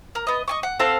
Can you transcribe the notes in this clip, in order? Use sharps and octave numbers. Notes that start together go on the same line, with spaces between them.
A#4
B3 D#5
D#5 G#5 C#6
F#5
C4 A4 F5 F#5